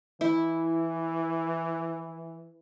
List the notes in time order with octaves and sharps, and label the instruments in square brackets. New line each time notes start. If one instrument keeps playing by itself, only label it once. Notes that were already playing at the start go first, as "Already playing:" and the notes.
[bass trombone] E3 [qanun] E4